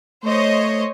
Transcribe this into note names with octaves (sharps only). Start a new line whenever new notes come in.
A3 C5 C#5 D#5